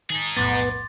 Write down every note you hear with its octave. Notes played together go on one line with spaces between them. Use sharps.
D#3 D#4 G#4 A5
B1 F2 A2 B3 C6 D6 A6